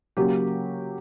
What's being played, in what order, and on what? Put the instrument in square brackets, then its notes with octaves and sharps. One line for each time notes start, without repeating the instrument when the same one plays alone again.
[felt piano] C#3 F#3 A#3 G4